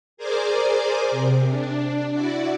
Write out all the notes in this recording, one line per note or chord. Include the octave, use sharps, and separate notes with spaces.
G#4 A#4 C5 D5 G#5 D6
C3
D4
E4 F#4 D5